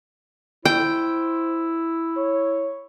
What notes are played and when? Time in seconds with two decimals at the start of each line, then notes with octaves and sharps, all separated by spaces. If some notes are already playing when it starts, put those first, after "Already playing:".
0.65 E4 C5 G5
2.17 C#5